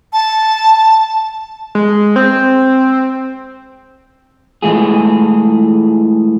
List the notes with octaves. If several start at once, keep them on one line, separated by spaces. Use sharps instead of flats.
A5
G#3
C4
A2 E3 G#3 A3 F4 G#4